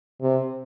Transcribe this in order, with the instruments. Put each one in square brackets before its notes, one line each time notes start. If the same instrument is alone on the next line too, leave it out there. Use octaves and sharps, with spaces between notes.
[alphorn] C3